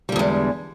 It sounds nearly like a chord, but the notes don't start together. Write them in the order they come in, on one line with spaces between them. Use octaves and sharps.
G3 D3 E2 G#3